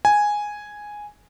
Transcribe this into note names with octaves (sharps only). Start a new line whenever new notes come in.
G#5